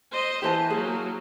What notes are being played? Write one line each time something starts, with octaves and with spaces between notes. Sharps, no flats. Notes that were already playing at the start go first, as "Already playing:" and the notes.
C5 D#5
E3 G4 C5 A5
F#3 A#3 G#4